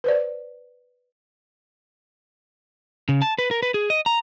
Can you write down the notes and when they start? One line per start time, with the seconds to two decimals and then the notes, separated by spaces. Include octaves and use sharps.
0.04 B4 C5 D5
3.09 C#3
3.22 A5
3.39 B4
3.51 A#4
3.63 B4
3.74 G#4
3.90 D#5
4.06 A#5